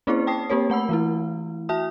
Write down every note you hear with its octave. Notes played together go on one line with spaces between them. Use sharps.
A#3 C4 C#4 E4 G#4 C5
G5 A5 D#6 C7
A#3 C4 G4 A#4 C#5
A3 F#5 B5 E6
E3 A3 E4
F#4 E5 A5 D#6